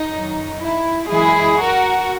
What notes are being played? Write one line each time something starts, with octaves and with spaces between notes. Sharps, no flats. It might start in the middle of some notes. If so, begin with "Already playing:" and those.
Already playing: D#4
F#2 D#3 F#3
E4
F#2 E3 G#3 E4 G#4
F#4 A#4